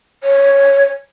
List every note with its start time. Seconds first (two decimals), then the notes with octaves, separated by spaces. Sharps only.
0.23 C#5